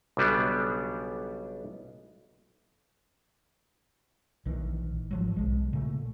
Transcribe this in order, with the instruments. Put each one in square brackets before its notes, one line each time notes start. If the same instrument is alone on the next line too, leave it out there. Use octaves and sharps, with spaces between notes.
[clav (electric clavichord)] B1 C#3 G3 B3 D4
[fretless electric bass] A#1 D#3 E3
G#1 F3 F#3
B1 G#3
A#2 C#3 A3